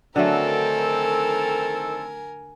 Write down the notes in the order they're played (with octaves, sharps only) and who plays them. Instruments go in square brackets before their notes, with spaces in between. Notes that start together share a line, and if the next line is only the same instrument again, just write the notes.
[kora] D3 F#3 A3 [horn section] D#3 C4 A4 [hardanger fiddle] A#4 G#5